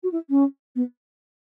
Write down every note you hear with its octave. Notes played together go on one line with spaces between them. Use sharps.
F#4
E4
C#4
B3